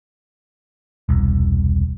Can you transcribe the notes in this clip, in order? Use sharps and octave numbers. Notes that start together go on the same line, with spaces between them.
E1 C2